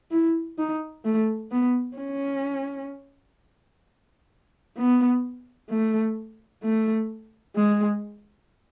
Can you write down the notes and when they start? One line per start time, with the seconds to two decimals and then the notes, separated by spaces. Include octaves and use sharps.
0.11 E4
0.58 D#4
1.05 A3
1.52 B3
1.97 C#4
4.78 B3
5.70 A3
6.64 A3
7.56 G#3